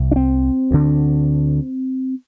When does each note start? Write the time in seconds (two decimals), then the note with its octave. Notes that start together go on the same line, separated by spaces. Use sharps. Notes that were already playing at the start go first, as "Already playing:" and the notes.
Already playing: C2 C3
0.12 D4
0.16 C4
0.71 D2 D3